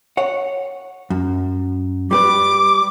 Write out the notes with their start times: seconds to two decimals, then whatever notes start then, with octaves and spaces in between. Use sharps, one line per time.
0.17 C#5 F#5
1.10 F#2
2.11 G3 G4 B4 D6